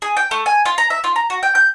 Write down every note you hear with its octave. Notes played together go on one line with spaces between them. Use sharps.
G#4
G5
A3
G#5
F4
A#5
E5
F4
A#5
F#4
G5
G6